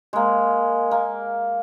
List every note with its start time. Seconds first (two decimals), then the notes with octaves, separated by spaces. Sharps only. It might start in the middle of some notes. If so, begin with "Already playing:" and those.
0.13 G#3 A#3
0.91 A#3